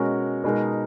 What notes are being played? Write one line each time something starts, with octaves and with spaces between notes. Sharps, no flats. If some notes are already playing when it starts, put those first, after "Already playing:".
Already playing: B2 G#3 C#4 F#4 A#4
B2 G#3 D#4 A#4 D#5